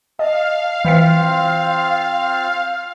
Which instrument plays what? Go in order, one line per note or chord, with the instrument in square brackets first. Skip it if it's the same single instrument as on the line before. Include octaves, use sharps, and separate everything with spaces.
[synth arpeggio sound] D#5 [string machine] F5 [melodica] A5
[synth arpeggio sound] E3 B6 C7 [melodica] C4 F4 C5